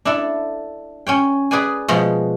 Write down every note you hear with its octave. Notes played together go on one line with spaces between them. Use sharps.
D4 E4 A4
C#4 C#5 G5
G#4 B4 D5 G#5
B2 F3 G#3